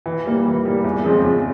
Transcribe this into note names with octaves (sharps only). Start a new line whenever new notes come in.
E3
G3 A#3
E3
G3 A#3
E2
C#3 F3 G#3 C4
E2